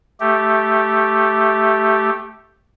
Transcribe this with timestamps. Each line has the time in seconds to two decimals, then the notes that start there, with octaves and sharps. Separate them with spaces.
0.20 A3 G4